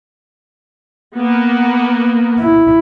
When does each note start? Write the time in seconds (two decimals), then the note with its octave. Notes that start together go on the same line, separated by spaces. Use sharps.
1.18 A#3 B3
2.39 E4